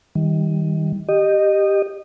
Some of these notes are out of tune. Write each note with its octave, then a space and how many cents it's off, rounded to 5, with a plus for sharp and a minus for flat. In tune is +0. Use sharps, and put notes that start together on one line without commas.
D#3 +25 G3 +0
G4 +0 D#5 -15